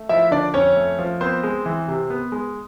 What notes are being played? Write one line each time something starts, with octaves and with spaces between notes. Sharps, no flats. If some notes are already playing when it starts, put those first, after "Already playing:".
Already playing: A3
F3 E4 E5
D3 D4 D5
F2 C#4 C#5
A3
F3
B3 C4 C5
G#3
E3
C3
B3
G#3